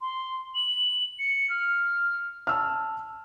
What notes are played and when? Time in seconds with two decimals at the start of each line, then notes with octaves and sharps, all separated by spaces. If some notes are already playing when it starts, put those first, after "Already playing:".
0.01 C6
0.55 F#7
1.19 C#7
1.50 F6
2.47 A5 E6 F6